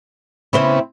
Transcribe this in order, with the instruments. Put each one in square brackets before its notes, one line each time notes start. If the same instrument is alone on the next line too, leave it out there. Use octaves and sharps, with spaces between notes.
[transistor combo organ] C#3 B3 [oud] C4 E4 C5